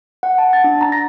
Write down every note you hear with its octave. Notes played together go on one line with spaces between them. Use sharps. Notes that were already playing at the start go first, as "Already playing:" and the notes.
F#5
A5
A6
D4
A#5
A#6